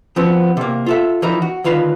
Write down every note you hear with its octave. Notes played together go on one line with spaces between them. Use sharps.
F3 B3 C4 F#4
C3 A#3
F4 A4 E5
E3 F3 D#4 E4 A#4
F#4
D2 D#3 F4 B4 C6